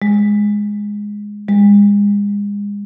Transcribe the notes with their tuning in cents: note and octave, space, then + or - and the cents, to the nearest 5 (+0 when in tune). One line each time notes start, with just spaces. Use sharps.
G#3 -5
G#3 -35